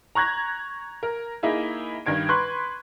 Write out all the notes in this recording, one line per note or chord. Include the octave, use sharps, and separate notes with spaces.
A#5 C#6 F#6 G#6 A#6
A#4
A#3 D#4 E4 G#4
G2 D#3 G#6 D7
B4 C6 C#6 F#6